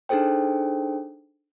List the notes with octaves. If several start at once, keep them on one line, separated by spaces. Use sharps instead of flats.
D4 D#4 G#4 A4 C5 G5